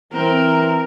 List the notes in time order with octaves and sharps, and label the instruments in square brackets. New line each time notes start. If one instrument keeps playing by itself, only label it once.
[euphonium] E3 [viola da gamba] C4 [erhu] A#4